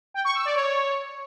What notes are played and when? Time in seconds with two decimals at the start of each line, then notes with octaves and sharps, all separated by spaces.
0.14 G5
0.25 C#6
0.35 E6
0.45 D5
0.56 C#5